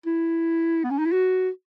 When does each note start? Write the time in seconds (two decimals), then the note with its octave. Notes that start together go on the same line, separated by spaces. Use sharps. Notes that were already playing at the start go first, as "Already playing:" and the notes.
0.06 E4
0.84 B3
0.91 C#4
0.99 D#4
1.06 E4
1.12 F#4